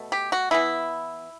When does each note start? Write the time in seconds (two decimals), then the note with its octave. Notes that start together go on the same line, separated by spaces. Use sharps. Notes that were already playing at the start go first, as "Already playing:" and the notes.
Already playing: B2 A3
0.12 G4
0.32 F#4
0.51 E3 B3 E4